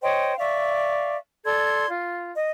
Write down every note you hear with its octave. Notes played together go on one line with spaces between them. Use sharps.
C5 C#5 D#5 G5
D5 E5 F5 C#6
A4 D5 C6 G#6
F4
D#5